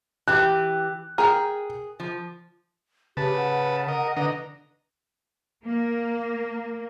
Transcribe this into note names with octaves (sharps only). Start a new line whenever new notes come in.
E3 G4 F#6
G#4 A#4 G5
F3
C#3 G4 B4 A5
F#5
A#4 D#5
D3 B4 D#5 A#5
A#3